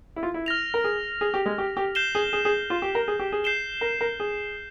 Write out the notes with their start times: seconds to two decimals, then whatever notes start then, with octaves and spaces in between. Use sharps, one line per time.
0.16 E4
0.23 F4
0.34 E4
0.46 F6 A#6 F7
0.74 A#4
0.84 G#4
1.21 G#4
1.34 G4
1.46 G#3
1.58 G4
1.77 G4
1.95 G6 C7 E7 G7
2.15 G#4
2.33 G#4
2.45 G#4
2.70 F4
2.82 G4
2.95 A#4
3.08 G#4
3.19 G4
3.32 G#4
3.44 G6 C7 E7 G7
3.81 A#4
4.01 A#4
4.20 G#4